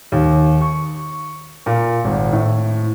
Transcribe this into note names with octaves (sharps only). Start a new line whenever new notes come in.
D#2
C#6
A#2
G#1
A2